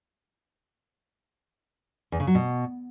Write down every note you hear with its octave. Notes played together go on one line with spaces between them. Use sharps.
E2
C#3
F#3
B2